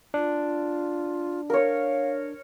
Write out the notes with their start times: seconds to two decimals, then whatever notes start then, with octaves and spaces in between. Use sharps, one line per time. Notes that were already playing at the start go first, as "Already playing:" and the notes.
0.14 D4 F4
1.50 A#4 C#5 F5